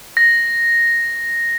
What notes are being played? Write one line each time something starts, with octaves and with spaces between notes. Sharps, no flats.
A#6